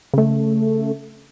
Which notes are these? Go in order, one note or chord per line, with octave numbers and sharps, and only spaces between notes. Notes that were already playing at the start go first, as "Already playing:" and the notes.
C#3 A3